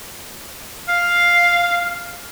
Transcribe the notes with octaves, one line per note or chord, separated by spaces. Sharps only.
F5